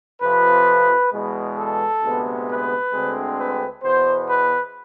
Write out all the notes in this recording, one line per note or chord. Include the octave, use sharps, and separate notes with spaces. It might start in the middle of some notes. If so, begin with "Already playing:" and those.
F2 C3 F3 B4
E2 B2 G#3
A4
D2 C3 G#3 B3
B4
D2 D3 G#3 C4
B4
E2 B2 B3 C5
B4